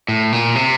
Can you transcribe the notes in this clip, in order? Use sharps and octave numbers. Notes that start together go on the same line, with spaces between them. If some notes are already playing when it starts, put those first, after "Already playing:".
A2
A#2
C3